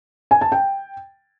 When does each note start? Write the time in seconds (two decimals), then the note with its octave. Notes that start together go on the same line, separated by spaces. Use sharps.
0.31 G#5
0.41 A5
0.52 G5